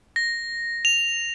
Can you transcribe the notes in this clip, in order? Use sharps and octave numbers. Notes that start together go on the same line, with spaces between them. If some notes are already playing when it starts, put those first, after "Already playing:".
A#6
F7